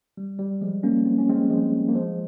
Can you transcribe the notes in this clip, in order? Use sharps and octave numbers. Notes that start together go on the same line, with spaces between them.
G3
G3
F3 G#3
A#3 C#4
C4
C#4
G#3 C4
F3 G#3
A#3
F3 G#3